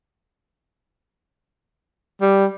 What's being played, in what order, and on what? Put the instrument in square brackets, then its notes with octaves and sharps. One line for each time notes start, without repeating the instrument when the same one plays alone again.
[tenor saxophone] G3